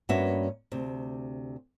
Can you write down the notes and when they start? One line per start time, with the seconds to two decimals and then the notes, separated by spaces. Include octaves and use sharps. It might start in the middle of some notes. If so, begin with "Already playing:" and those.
0.09 G2 A#3 B3 C#4 F#4 E5
0.72 D2 C3